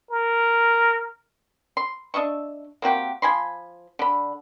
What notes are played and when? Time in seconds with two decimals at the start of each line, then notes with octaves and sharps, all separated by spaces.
0.11 A#4
1.77 C6
2.14 D4 D#5 E5 C#6
2.82 A#3 C4 F#4 G4
3.22 F3 G#5 B5 C6
3.99 D3 B5